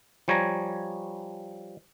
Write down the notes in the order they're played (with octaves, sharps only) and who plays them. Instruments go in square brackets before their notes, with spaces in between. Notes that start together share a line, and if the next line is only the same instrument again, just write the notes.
[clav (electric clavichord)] F3 G3 C#5 G#5 A#5